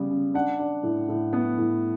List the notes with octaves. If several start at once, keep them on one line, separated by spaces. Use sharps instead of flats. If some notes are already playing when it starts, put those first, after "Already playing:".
Already playing: C#3 G3 B3
C#3
D4 F#5
D4
A2
A2
B3
A2